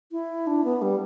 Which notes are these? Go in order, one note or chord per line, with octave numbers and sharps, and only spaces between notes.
E4
D4
B3
G3